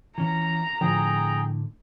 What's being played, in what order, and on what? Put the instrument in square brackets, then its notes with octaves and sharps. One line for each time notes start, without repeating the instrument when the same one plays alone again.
[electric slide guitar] E3 C#4 [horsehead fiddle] A#5
[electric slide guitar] A2 D3 [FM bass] F3 [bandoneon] G#4 G5